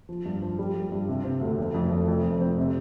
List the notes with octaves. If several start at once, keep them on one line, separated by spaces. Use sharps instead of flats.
F3
G2
F3
G3
G3
G2
C3
C4
D2
F1
F2
F1
F2
F2
C4
C3